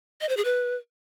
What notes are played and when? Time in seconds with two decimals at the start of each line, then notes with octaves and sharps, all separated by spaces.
0.21 D#5
0.29 C5
0.37 G#4
0.45 B4